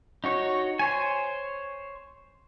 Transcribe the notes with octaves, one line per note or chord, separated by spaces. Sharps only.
D#4 F#4 C#5
C5 C#5 G#5